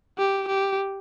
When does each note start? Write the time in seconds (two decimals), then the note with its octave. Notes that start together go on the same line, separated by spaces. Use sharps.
0.18 G4
0.48 G4